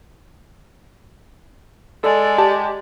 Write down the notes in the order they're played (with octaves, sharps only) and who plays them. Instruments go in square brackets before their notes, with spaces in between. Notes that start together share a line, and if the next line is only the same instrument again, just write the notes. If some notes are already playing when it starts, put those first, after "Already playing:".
[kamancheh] G#3 [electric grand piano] A4 [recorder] D5
[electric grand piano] G4 A5